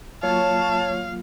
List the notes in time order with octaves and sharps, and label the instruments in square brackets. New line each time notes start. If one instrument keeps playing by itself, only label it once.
[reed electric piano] F#3 A#3 F4 [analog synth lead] C#5 [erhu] F5 [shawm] A5